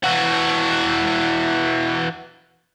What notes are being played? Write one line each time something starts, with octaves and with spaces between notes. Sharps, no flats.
E3 F#4